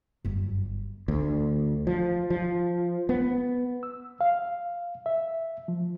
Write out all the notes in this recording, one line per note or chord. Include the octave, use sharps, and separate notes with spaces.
G1 F#2
D2
F3
F3
B3
E6
F5
E5
F3